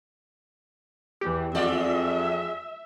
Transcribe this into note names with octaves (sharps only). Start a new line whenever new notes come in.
E2 E3 G4
F2 G#3 F4 D5 E5